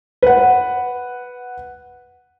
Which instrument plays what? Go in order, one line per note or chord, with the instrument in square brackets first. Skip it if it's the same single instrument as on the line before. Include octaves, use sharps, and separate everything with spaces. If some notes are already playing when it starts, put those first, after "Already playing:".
[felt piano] B4 F#5